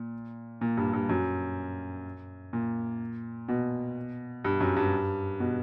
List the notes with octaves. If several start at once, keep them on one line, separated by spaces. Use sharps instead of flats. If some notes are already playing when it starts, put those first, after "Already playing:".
Already playing: A#2
A#2
G2
G2
F#2
A#2
B2
G2
F#2
G2
B2